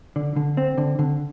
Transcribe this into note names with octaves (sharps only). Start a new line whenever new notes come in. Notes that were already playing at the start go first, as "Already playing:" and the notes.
D3
D3
C4
D3
D3